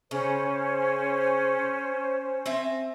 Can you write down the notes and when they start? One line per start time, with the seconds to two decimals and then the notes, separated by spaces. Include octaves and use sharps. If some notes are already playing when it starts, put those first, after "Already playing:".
0.11 C#3 C#4 C5
2.46 C4 E5 G#5